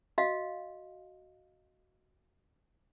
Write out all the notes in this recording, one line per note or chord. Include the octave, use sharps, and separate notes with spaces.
F#4 D#5 F5